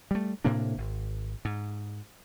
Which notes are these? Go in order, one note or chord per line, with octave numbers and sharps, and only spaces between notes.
G3 A3
A2 C3 A#3 D4
G#1
G#2